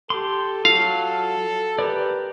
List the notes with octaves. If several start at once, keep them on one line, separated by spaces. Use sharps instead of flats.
G4 A4 C6
F#3 F4 A4 F5
G4 A#4 B4 D5